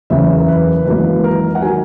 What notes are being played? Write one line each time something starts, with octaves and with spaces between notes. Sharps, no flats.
F#1 E2 C#3 E5
A#4
B4
G#1 F#2 E3 A#3 B4
A#4
F#5
D#3 F#3 G#5